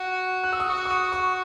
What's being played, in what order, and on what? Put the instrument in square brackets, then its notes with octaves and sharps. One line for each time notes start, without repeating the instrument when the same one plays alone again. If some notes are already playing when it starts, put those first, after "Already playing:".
Already playing: [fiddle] F#4
[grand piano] F#6
E6
D#6
[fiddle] F#4 [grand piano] C#6
[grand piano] C#6
D#6
C#6